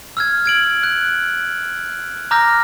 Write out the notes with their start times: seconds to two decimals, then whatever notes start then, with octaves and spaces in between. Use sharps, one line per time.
0.17 E6 F6 G#6
0.46 G#6 D7 F#7
0.83 F#6
2.31 A#5 D6 E6 F6 G6 A#6